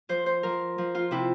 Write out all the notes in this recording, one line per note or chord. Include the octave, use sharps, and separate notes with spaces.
F3 C5
C5
F3 A#4
F3
F4
C3 E4